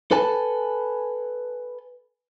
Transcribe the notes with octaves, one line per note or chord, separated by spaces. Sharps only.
A4 B4 G#5 A5